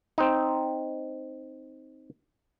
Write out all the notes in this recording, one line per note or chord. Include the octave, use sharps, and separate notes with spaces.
C4 D#4